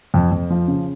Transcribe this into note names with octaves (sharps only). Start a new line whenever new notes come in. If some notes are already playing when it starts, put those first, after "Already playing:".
F2
F2
F3
C#3